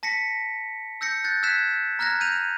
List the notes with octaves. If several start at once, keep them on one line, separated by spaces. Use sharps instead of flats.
A5 A#6 B6 C#7
E6 G6 A#6 C#7
F#6 G6 A6
E6 F#6 G#6 B6 E7
A#5 F6 F#6 G#6 A#6
G6 D#7 F7